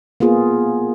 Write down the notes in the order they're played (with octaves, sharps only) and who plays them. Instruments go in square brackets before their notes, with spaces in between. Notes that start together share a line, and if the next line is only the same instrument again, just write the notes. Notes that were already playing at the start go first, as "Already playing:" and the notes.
[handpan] A#3 B3 F4 G#4